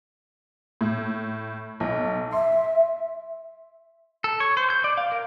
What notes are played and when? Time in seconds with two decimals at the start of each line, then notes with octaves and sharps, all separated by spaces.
0.81 A2
1.80 B1
2.33 E5 C6
4.24 A4
4.40 C#5
4.57 C5
4.70 G6
4.84 D5
4.98 F5
5.12 A#4